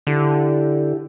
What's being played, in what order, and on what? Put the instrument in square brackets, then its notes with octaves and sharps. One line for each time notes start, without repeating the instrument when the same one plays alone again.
[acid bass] D3 [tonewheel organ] E4 G4